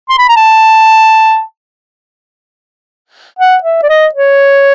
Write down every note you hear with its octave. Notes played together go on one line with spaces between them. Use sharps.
C6
B5
A#5
A5
F#5
E5
D5
D#5
C#5